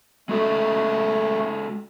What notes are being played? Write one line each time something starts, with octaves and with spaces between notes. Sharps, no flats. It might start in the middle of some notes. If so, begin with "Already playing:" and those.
G#3 A3 F#4 A4